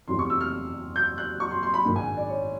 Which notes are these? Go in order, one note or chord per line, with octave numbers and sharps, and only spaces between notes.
F1 E2 C3 E3 C6
C#6
E6
F6
G6
F#6
C#6
C6
C6
B5
A#1 G#2 D#3
G#5
D5
C#5